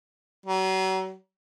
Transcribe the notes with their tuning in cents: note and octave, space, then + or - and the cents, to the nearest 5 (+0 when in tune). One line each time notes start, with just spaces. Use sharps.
F#3 +40